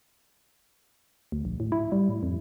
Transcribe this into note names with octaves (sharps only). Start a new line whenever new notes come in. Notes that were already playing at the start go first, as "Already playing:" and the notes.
D2
A#1
A2
E4
G3
A2
F2